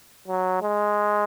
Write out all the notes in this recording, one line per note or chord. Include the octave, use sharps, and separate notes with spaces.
F#3
G#3